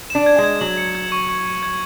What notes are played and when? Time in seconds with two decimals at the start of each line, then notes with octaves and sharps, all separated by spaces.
0.10 D4 E7
0.26 G#6
0.38 G#3
0.44 G#6
0.61 F#3 F#7
0.78 C#7
0.95 G#6
1.12 C#6
1.29 C#6
1.45 C#7
1.63 G#6